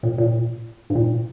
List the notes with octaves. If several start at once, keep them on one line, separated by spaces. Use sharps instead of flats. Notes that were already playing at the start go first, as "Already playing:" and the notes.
A#2
A#2
G#2
A#2